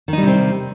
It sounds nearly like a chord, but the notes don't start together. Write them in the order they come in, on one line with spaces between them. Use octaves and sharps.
D#3 D#4 G3 C3 C4